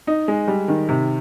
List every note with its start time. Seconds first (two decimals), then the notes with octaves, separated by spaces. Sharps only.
0.07 D#4
0.28 G#3
0.48 G3
0.68 D#3
0.89 C3